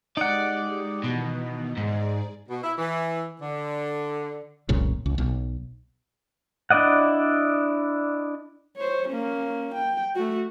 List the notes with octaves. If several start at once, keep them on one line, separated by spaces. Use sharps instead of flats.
G#3 D#4 G4 D5 F#5
B2 D#3 E3 B3
G#2 G#4 D5
B2
E4
E3
D3
F1 C2 A#2 C#3
C#2
B1
D4 E4 D5 D#5 F#5
C5 C#5
A#3 C#4
G5
A3 F#4